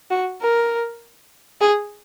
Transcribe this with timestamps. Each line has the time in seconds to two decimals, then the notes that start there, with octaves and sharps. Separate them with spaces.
0.10 F#4
0.41 A#4
1.61 G#4